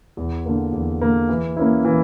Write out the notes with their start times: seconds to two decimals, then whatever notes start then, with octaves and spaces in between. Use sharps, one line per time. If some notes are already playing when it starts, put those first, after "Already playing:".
0.17 E2
0.46 D3 A#3
0.73 E2
1.01 D3 A#3
1.29 E3
1.56 A#3 C#4 E4
1.85 E3